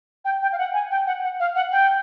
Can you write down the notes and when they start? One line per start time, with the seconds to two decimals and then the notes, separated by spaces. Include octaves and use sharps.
0.25 G5
0.42 G5
0.53 F5
0.58 F#5
0.74 G#5
0.91 G5
1.07 F#5
1.23 F#5
1.40 F5
1.55 F#5
1.72 G5